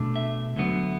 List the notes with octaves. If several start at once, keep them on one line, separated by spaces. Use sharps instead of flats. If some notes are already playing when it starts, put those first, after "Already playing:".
Already playing: B2 A3 D4
E5
D2 D3 F#3 B3